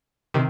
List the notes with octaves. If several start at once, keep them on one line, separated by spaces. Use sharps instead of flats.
C3 D#3